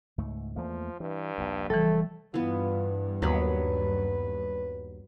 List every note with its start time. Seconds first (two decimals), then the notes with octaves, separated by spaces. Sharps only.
0.18 C#2 G#2 A3
0.56 E2 F3 A3 A#3
1.00 G2 E3
1.38 A#1 D#2
1.70 F1 C#3 E3 F3 G3 A3 A4
2.34 G2 E3 B3 F4
3.22 D#2 F#3 B3 B4 B5